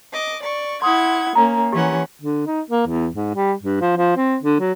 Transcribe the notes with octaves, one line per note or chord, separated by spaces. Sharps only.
D#5 D6
D5 C#6
E4 F#5 C6 D#6 G#6
A#3 C#4 A#5
E3 C#4 G4 F#5
D3
D#4
A#3
E2
G#2
G3
G2
F3
F3
C4
D3
F#3